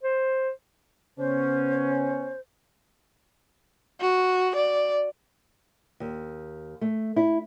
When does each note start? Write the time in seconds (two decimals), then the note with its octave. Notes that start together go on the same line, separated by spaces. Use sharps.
0.03 C5
1.19 C#3 B3 C#4 C5
4.01 F#4
4.56 D5
6.00 D#2
6.81 A3
7.16 E4